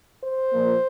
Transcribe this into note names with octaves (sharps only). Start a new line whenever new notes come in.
C5
A#2 F3 A#3